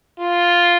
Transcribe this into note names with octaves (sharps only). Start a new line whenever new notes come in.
F4